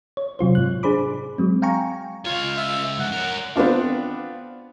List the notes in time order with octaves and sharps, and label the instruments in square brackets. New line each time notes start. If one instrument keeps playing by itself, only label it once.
[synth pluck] C#5
C3 F#3 F4 C5
G#2 F#6
D4 G#4 C5 B5 D6
F#3 G#3 C4
F5 G5 G#5 A#5 C#6
[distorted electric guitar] C#2 C#5 [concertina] F4
[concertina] E5
[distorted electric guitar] G#2 F3 [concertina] F#5
[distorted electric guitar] A#4 C#5
[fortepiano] B3 C4 D4 F4